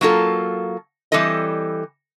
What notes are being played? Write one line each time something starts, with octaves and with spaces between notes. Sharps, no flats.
F#3 A#3 F4 A4
E3 G3 C4 A4 D#5